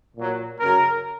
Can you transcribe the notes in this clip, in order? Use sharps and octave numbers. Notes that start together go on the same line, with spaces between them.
A#2 F#3
F#2 C#3 F#3 A#4